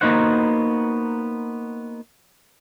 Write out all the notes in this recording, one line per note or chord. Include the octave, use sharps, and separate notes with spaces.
A#3 B3 D#4 F#4 C5 F#5